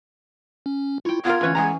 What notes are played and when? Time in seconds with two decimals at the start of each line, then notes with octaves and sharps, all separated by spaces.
0.66 C#4
1.05 E4 F4 C#5 G5
1.25 B3 F4 A#4 G#6
1.41 D2 E3 C#4 B4 C#5
1.55 G#3 B3 G#5 A#5